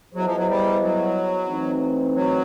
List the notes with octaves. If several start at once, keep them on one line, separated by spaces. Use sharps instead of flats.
F#3 B3 E4 G#4 C5 D#5
F3
F#3
G3
F#3
E3 A3 C4 D#4
F#3